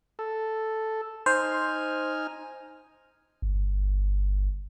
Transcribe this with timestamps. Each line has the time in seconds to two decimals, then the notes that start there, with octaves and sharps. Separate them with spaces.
0.19 A4
1.26 D#4 C5 G#5 F6
3.42 G1